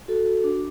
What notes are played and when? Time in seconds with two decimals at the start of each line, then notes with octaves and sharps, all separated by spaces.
0.08 F#4 A4
0.26 F#4
0.44 D4